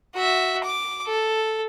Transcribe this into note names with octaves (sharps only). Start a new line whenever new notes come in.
F#4 E5
D6
A4